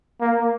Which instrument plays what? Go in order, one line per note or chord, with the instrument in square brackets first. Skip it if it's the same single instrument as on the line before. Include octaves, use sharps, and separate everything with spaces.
[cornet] A#3